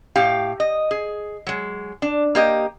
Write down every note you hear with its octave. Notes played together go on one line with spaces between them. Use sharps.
A2 G4 F5
D#5
G#4
F#3 G#3
D4
A#3 G4 D#5